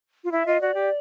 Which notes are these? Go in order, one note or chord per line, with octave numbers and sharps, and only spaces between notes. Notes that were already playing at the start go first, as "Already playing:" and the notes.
F4
E4 E5
F4 D#5
F#4 D5
G4